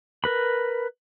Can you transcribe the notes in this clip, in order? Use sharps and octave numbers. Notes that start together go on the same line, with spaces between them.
A#4 B4 B5